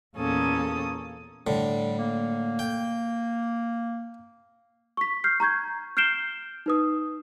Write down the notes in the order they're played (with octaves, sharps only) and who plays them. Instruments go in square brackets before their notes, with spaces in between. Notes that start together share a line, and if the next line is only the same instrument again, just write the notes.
[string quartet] E2 A#2 A#3 C#4 A4 D#6
[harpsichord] A2 D3 [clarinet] G3
[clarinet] A#3
[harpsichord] G5
[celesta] C#6 B6
F6 G6 C7
A#5 C#6 G6 G#6
F6 G6 C7 D7 E7 G7
D#4 B4 D#6